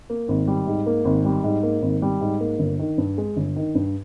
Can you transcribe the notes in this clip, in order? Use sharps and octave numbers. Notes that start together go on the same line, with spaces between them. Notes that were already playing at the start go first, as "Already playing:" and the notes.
A#3
G#1
G3
G#2
A#3
G#1
G3
G#2
A#3
G#1
G3
G#2
A#3
G1
D#3
G2
G#3
G1
D#3
G2